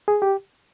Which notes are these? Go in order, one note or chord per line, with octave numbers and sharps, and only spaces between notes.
G#4
G4